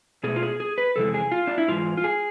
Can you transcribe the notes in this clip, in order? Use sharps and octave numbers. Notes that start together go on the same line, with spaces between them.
B2 A3 G#4
F4
G#4
G#4
B4
F2 C3 E3 G#3 A4
G#4
F4
D4
E4
G#2 E3 G#3 F4
F4
G#4